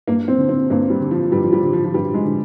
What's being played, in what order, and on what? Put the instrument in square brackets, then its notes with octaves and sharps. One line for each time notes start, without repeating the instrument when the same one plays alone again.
[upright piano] G2 A#3
C4
D3
C4
G2 A#3
G3
D3
F3
G2 G3
F3
G3
D3
F3
F3
G2 G3
G#3
D3